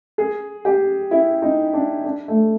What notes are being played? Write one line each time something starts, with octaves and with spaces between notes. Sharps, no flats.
G#4
G4
E4
D#4
D4
D4
A3